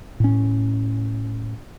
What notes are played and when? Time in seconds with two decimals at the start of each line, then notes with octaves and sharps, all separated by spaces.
0.20 A2 C#4